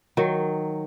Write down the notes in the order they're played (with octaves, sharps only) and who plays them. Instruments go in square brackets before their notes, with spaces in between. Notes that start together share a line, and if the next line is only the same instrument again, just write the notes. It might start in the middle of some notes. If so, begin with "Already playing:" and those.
[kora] D#3 F#3